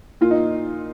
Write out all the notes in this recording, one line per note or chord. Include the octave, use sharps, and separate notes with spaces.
A#2 F4
D#4